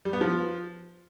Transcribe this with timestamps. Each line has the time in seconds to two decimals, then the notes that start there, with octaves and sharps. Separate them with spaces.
0.05 G3
0.13 B3
0.21 F3